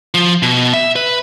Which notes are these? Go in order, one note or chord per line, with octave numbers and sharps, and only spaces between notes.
F3
B2
E5
B4